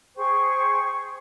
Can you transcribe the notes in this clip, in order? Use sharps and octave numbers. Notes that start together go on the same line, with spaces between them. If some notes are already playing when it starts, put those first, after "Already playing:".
G#4 C5 G5 C#6